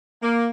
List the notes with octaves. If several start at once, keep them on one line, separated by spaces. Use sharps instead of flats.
A#3